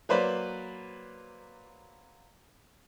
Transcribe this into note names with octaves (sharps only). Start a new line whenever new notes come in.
F#3 A#3 B4 C5 D5 B5